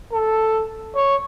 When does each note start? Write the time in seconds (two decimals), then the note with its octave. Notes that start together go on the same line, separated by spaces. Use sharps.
0.12 A4
0.95 C#5